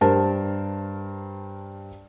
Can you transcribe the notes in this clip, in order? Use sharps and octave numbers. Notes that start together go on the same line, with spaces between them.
G2 A#4 C5 A5